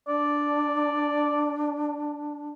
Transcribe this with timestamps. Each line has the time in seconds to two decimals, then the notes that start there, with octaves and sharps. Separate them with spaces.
0.08 D4 D5